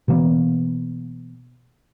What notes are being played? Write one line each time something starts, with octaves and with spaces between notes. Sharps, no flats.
B2 E3 A#3 B3